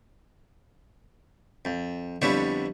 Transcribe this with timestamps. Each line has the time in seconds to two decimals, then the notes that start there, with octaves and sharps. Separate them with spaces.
1.65 F2
2.22 F2 D3 G3 B3 E4 C#5